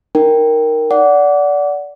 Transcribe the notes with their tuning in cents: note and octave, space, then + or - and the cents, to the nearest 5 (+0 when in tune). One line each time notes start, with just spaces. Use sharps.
D#4 -10 A#4 +0 G5 +0
D5 -20 F#5 +0 D6 -25